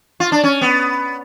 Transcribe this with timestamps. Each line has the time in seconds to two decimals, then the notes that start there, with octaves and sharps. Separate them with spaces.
0.20 F4
0.32 D4
0.44 C#4
0.61 B3